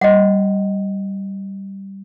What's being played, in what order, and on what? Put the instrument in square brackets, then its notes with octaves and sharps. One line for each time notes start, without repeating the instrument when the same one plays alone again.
[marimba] G3 [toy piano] D#5 F#5